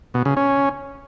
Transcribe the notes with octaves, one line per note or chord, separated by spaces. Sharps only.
B2
C#3
C#4